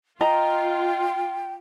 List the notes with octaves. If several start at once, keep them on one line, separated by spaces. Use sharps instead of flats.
F4 D#5 G5 A#5